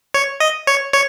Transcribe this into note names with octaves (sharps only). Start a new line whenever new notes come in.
C#5
D#5
C#5
C#5